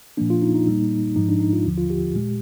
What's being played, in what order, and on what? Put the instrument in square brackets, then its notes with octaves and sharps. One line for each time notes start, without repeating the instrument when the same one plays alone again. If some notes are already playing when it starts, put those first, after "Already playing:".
[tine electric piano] A#2 F3 A#3 D4
F4
D#4
D#4
A#2 G3 A#3
G#2 F3 G#3 D#4
D4
D#4
F4
D#2 D3 F3
F4
G4
A#2 G#3